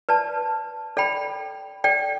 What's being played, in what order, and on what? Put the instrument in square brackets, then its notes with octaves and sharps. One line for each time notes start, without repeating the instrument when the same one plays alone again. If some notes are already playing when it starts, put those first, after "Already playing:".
[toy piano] B4 D5 A5
A4 D5 G5 B5
A4 D5 G5